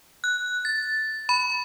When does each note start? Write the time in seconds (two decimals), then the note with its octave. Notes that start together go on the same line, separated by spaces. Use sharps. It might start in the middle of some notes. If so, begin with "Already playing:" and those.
0.24 F#6
0.65 A6
1.29 B5